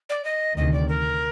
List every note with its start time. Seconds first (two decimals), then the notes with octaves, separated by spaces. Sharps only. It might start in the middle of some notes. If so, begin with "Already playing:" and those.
0.09 D5
0.24 D#5
0.56 D2 C3 D#3 D#5
0.72 D5
0.88 A#4